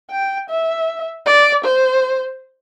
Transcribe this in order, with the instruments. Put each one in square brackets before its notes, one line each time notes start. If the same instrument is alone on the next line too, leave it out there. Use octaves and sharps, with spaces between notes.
[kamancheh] G5
E5
D5
C5